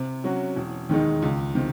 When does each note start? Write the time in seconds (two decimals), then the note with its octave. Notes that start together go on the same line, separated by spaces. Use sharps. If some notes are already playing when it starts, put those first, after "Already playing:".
Already playing: C3
0.24 F#3 C#4 F#4
0.56 E1
0.89 D#2 D#3 G#3 D#4
1.22 C#2
1.55 C3 D#3